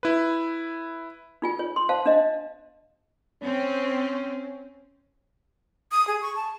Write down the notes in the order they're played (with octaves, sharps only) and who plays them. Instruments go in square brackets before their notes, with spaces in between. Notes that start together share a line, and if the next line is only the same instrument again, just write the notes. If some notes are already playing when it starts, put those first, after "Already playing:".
[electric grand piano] E4 B4
[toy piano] D#4 F4 G#5
C#5
C6
C5 F5 A5
D4 D#5
[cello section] C4 [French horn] C#4
[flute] D#6
G#4
C#6
A5